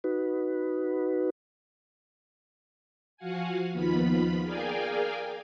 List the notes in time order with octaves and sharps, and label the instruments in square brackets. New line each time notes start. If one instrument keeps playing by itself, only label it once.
[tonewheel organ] D#4 F#4 B4
[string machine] F3 F#4 F5 F#5 G#5
D#2 D#3 F3 B3 F4 B5
G#4 A#4 D5 F5 G5 G#5